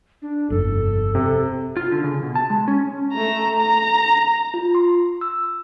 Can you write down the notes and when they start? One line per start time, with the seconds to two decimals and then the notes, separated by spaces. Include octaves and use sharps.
0.22 D4
0.50 G1 F2 A4
1.15 C3 A4
1.77 F4
1.91 D3
2.04 C#3
2.23 B2
2.35 A5
2.50 G#3
2.68 C#4
3.13 A3 A#5
3.59 A#5
4.54 F4
4.75 C6
5.21 E6